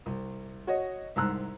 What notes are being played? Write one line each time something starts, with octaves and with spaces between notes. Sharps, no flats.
C2
F#4 C#5 D#5
C2 G#2 A#5 E6 F#6